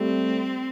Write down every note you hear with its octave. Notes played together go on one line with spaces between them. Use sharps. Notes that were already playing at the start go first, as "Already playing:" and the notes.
Already playing: G3 A3 C4